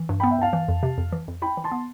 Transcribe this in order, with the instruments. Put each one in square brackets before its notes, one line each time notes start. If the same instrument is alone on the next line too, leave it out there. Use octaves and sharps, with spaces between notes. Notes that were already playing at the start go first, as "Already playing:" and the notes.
Already playing: [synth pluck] E3
G2
[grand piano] G5 B5
[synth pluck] B3
[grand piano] E5 G5
[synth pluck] G2 [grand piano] F5 A5
[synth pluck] E3
F2
C3
F2
E3
F2
[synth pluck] E4 [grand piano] G5 B5
[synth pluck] E3
[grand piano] A5 C6
[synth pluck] B3